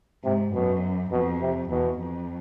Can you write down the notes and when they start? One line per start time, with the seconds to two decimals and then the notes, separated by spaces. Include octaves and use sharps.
0.24 G#2 C3
0.53 F#2 B2
1.11 F2 B2
1.41 C3
1.70 E2 B2
1.99 F2